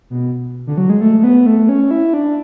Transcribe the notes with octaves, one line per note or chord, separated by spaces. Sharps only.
B2
D3
F#3
G#3
A3
A3
B3
A3
C#4
E4
D4